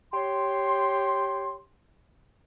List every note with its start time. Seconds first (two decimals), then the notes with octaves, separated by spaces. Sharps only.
0.13 G4 C#5 C6